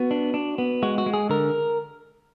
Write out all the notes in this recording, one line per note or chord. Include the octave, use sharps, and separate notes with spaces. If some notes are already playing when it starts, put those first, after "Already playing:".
Already playing: B3 F#4
D4
D4
B3
G#3 F#4
F#4
G#3
G#4
D3 A#4